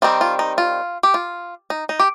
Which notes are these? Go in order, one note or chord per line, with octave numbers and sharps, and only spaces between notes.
D#3 G3 C4 D#4 F4
F4
D#4
F4
G4
F4
D#4
D#4
G4